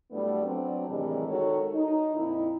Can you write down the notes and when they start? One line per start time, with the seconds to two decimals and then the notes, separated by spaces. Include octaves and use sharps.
0.11 A2 F#3 G3 A3 B3 D4
0.45 F#3 C4 D4
0.88 A2 C3 D#3 E3 G3 G#3
1.28 D#3 G#3 F#4 A4 C#5
1.73 D#4
2.16 F2 A#2 D#4 E4